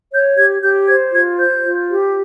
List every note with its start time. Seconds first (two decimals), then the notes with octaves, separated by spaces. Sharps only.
0.11 C#5 G6
0.37 G4 G#6
0.61 G4 G6
0.87 C5 G#6
1.13 F4 G#6
1.37 C5 G6
1.64 F4
1.89 G4